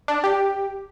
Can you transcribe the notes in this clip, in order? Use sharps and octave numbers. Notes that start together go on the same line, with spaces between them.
D4
G4